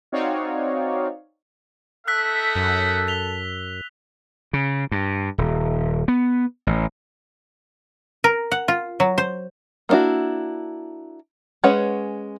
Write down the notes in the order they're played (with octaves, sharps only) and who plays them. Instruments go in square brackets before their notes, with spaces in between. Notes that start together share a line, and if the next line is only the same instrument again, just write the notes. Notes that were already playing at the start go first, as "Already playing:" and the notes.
[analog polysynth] C4 D#4 F#4 C#5 D5 F5
[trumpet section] D#4 E5 F#5 [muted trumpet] A4 [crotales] E6 F#6 B6
[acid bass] F#2
[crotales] B6 F7 G7
[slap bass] C#3
G2
D#1
B3
A1
[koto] A#4
F#5
F4
F#3
C5
[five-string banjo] A#3 B3 D4 E4 F#4
G#3 C#4 B4 C#5 F#5